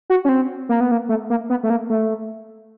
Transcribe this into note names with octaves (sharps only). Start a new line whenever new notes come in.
F#4
C#4
C4
A#3
B3
A#3
A3
A#3
B3
A3
A#3
A3